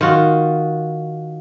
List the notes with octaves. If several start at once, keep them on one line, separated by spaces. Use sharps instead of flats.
D#3 F4 F#4